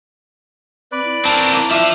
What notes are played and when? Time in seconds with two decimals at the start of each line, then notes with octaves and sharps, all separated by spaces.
0.92 C4 B4 D5
1.04 E4
1.25 C4 A#4 A5
1.52 A#3 E4
1.71 F3 D4 E5 D6